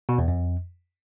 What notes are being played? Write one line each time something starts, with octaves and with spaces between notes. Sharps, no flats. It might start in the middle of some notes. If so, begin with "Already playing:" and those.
B2
E2
F2